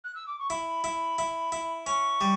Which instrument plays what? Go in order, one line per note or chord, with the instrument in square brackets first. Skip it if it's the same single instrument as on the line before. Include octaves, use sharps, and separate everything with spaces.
[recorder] F#6
E6
D6
C#6
[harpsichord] E4 [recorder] B5
[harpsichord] E4
E4
E4
[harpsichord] C#4 [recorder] C#6
[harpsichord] G3